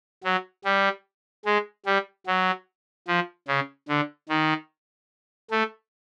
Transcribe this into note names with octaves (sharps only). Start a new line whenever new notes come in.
F#3
G3
G#3
G3
F#3
F3
C#3
D3
D#3
A3